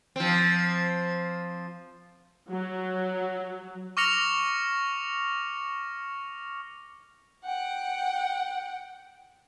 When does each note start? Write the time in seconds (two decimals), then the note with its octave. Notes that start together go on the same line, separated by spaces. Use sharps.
0.16 F3 C4
2.51 F#3
3.97 C#6 D6 F6 A#6 C#7 F7
7.45 F#5 G5